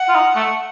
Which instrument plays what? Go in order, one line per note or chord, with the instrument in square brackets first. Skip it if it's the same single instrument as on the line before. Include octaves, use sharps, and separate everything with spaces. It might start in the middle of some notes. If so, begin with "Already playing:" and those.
Already playing: [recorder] F#5
[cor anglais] F4
D#4
A3